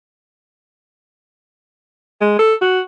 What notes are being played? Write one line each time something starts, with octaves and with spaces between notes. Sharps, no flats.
G#3
A4
F#4